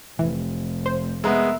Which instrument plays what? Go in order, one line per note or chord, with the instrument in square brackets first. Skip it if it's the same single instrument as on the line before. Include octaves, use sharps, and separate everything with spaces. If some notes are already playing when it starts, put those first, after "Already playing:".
[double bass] F1 [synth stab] E3
[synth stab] C5
[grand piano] G#3 B3 [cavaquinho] A#4 E5